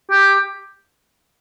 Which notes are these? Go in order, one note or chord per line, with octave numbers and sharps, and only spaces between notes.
G4